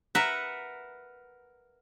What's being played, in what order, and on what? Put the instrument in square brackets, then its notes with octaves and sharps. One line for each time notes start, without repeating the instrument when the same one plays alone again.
[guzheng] A#4 B4 E5 F#5